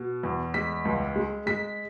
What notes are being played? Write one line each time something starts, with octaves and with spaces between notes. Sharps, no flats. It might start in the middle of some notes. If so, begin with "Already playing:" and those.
Already playing: B2
E2
G#3 B6
C#2
G#3
G#3 B6